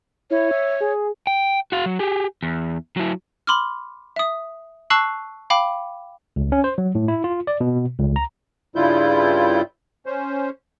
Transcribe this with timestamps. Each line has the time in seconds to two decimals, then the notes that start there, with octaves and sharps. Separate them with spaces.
0.31 E4 C#5
0.51 E5
0.81 G#4
1.27 G5
1.72 F#4 F5
1.86 F#3
1.99 G4 G#4
2.43 E2
2.97 F#3 E4
3.47 B5 C6 D6 F6
4.16 E5 D#6
4.90 A5 C#6 E6 F#6 C7 F#7
5.50 F5 G5 B5 D6
6.36 C#2
6.52 C#4
6.64 C5
6.78 F#3
6.95 A2
7.08 E4
7.24 F4
7.47 D5
7.60 B2
8.00 C#2
8.16 A#5
8.76 G2 C#3 G3 E4 F4 G6
10.06 C#4 C5